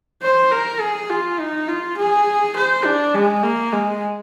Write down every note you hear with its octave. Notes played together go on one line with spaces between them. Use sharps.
C5
A#4
G#4
F4
D#4
F4
G#4
C5
D4
G#3
A#3
G#3